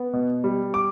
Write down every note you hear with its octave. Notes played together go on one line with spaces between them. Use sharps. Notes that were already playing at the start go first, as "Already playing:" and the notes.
Already playing: B3
B2
G3
D6